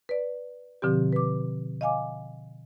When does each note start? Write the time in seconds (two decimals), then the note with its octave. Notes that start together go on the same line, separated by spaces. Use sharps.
0.09 B4 D5
0.82 B2 D3 F3 C4 G4
1.13 B4 D6
1.81 D#5 F5 G#5 D6